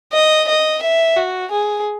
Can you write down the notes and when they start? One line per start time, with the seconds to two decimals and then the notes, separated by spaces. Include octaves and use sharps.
0.13 D#5
0.48 D#5
0.83 E5
1.17 F#4
1.52 G#4